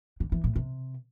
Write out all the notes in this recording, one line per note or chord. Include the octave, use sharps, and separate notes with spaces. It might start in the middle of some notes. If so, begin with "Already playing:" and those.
D3
E3
A2
C3